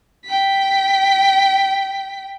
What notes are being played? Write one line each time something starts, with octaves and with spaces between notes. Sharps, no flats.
G5 B6